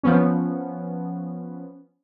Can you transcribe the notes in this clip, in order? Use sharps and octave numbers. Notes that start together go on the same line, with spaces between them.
F3 B3 C#4